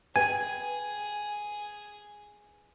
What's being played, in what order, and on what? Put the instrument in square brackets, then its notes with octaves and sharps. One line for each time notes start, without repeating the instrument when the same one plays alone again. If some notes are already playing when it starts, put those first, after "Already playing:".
[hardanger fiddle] G#4 [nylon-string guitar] B4 G5 [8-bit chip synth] G#5